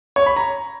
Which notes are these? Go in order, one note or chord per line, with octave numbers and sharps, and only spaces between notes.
C#5
B5
A#5